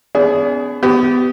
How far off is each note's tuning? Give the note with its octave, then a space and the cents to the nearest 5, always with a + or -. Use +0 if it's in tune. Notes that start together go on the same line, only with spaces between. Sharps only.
B3 +25 D4 -40 G#4 +0
B3 +20 G4 -20